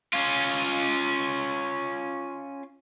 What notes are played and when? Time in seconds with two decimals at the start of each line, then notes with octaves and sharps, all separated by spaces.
0.14 C#4 F4